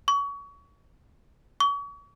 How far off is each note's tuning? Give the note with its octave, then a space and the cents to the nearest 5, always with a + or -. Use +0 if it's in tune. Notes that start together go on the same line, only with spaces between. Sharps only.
C#6 +30
C#6 +40